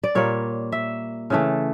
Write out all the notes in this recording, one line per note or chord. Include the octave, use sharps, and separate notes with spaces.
D5
A#2 G3 A#3 C#5
E5
C#3 E3 A3